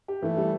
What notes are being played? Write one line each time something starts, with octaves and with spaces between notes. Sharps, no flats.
G4
E3 A3
G3